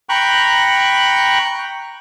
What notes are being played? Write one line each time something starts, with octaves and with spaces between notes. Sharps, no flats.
G5 A#5 B5 C#6 F#6